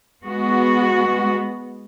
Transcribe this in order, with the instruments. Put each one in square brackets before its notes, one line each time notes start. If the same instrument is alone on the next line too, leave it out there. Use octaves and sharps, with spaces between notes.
[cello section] G#3 B3 F#4